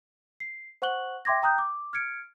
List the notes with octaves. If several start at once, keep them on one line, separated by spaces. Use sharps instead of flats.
C7
C5 F#5 C#6 F#6 F#7 G7
E5 G5 C6 D6 G#6 A#6
G5 A#5 D#6 F#6 G6
D6
F6 G#6 C#7 D7